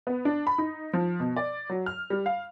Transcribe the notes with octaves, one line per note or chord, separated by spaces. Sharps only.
B3
D4
B5
D#4
F3
B2
D5
F#3
F6
G3
F5